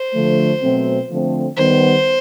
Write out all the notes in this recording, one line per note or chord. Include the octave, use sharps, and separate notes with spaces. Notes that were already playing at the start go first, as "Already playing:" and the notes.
Already playing: C5
D3 F3 A3
B2 F#3 A3 C4
D3 F3 A3 C4
D#3 G3 B3 C5